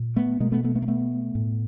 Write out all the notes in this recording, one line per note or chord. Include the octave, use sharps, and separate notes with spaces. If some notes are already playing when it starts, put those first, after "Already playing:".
Already playing: A#2
A3 B3
B2 G#3 A#3
A3 B3
A3 B3
A3 B3
A#3
A3 B3
A2